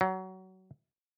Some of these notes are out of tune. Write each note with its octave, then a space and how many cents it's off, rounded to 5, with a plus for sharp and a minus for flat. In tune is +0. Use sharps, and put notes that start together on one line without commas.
F#3 +20